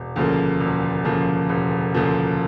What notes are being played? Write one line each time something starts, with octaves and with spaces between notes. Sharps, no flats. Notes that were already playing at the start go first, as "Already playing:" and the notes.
Already playing: E1
D2 C#3 F3 A#3
E1
D2 C#3 F3 A#3
E1
D2 C#3 F3 A#3